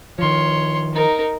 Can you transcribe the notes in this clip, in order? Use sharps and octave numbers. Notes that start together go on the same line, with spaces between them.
D#3 F3 C#5 C6
D#4 A#4